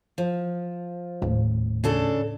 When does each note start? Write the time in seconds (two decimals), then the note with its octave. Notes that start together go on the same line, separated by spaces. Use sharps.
0.18 F3
1.22 D#1 A2
1.84 C#3 D4 A4